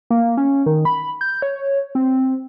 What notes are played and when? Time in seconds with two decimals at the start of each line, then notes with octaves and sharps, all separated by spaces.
0.10 A#3
0.37 C#4
0.66 D#3
0.85 B5
1.21 G6
1.42 C#5
1.95 C4